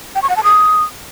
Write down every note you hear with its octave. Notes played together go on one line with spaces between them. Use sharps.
G5
C#6
F#5
A5
D#6